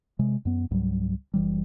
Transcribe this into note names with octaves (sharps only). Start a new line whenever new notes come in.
C3 G#3
F#2 B3
C#2 G#2 F#3 G3
F#1 E3 G3